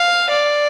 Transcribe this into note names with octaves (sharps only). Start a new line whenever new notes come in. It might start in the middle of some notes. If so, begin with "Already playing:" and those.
Already playing: F5
D5